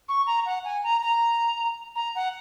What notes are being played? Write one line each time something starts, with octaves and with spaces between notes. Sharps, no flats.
C#6
A#5
F#5
G#5
A#5
A#5
A#5
F#5